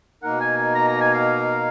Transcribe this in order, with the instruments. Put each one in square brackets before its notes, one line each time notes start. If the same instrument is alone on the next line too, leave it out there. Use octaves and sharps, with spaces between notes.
[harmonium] B2 A#3 D#4 A#4 [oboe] F#5
[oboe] G#5
G#5
A#5
A#5
G#5
F5